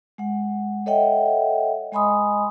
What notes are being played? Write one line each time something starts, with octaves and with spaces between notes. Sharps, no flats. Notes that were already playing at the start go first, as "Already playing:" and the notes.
G#3 F#5
A4 C#5 D#5 E5 F#5 G5
G#3 D#5 G#5 B5 C6 D#6